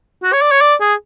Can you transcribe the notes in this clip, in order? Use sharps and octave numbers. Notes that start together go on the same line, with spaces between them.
F#4
C#5
D5
C#5
D5
G#4